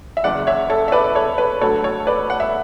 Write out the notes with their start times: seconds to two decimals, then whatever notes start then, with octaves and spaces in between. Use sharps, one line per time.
0.17 E5
0.24 F#1 E2 C#3 D5 F#5
0.47 C#5 E5
0.70 A4 C#5
0.88 E5
0.92 B4 D5
1.04 D5
1.15 A4 C#5
1.38 B4
1.61 D2 D3 F#3 A4 C#5
1.84 A4 C#5
2.07 B4 D5
2.30 F#5
2.40 E5